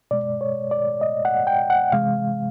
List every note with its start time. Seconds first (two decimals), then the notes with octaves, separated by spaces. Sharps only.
0.11 B2 G#3 D5
0.41 C#5
0.71 D5
1.01 D#5
1.25 F#5
1.47 G5
1.70 F#5
1.92 C3 E3 G#3 F5